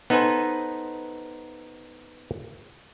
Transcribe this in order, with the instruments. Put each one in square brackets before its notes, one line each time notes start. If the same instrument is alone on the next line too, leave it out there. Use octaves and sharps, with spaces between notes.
[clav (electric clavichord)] B3 D#4 A4 B4 C5 G#5